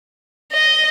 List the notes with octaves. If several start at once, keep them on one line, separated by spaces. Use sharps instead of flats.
D#5